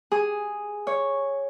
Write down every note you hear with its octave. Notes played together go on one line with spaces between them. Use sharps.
G#4
C#5